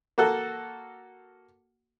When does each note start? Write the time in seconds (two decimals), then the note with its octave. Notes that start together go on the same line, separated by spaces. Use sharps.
0.18 A#3 F#4 A4